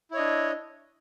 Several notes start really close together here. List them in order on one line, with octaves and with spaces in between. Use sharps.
E4 C#5 D#5 D4